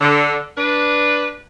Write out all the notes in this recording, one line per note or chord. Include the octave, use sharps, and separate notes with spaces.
D3
D4 B4